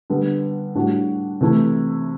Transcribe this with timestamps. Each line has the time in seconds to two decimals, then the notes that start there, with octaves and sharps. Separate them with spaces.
0.10 D3 G3 B3
0.75 A2 G3 D4 F#4
1.41 C3 E3 A3 E4